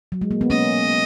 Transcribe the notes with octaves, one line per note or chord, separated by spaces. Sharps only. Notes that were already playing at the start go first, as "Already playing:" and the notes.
F#3
G#3
A#3
B3
A#3 C#4 D#5